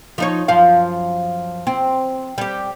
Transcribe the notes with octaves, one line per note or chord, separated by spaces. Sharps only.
F3 D#4 C#5
F#2 F3 F5
C4
G3 G4